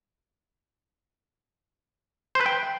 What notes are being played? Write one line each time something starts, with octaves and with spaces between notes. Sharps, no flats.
C5
B4
G5